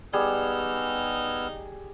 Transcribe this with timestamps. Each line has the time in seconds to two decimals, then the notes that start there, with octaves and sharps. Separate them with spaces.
0.13 G3 B3 D#4 G#4 E6 F6